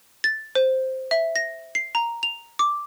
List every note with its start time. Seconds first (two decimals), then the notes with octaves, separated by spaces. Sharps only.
0.24 A6
0.55 C5
1.11 E5
1.36 A#6
1.75 C7
1.95 A#5
2.23 F7
2.59 D6